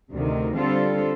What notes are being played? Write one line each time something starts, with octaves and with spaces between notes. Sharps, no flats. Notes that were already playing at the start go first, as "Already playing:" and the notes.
D2 C3 D#3
D3 G3 C4 F4 A4